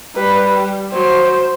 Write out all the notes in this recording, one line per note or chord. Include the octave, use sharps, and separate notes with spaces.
G3 B4
F#3 C5